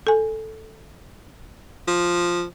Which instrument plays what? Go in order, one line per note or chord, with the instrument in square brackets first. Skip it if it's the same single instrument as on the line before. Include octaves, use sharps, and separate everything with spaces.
[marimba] A4 G#5
[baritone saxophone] F3